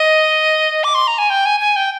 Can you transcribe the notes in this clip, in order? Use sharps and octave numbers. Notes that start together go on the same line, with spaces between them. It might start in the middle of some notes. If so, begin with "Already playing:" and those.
Already playing: D#5
D6
C6
A#5
G#5
G5
G#5
G#5
G5